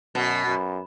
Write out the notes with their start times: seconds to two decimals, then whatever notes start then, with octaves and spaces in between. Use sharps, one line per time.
0.15 F#2 B2
0.47 F#2